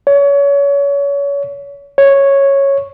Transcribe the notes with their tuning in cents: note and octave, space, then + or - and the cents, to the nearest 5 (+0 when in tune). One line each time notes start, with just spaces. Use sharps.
C#5 +30
C#5 -5